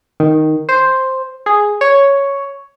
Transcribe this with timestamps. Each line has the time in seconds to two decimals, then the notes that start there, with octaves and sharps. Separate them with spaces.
0.20 D#3
0.69 C5
1.46 G#4
1.81 C#5